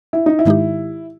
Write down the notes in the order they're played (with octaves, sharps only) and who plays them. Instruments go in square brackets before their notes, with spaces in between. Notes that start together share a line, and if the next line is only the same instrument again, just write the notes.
[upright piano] E4
D#4
E4
[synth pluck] G#2 D#3 G#3 D#4 G4